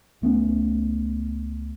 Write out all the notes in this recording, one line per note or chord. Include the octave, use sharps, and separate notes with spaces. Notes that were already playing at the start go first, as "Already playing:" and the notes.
C#2 A3 B3 C#4